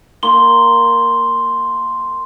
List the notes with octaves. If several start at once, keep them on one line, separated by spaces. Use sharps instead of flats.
A#3 C6 G7